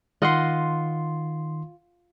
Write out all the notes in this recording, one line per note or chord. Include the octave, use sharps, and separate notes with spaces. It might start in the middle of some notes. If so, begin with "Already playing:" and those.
D#3 F4 D#5 F#5 C6